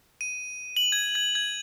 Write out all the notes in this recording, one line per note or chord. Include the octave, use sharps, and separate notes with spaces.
D#7
F#7
G#6
G#6
G#6